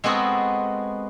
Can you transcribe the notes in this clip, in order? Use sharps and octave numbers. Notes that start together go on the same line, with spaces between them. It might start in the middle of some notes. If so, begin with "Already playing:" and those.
G#3 B3 C4 F#4 G#4 A4